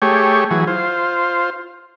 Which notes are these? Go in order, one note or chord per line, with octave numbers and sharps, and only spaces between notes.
A3 G4 G#4 C#5
E3 F#3 G#4
F4 C5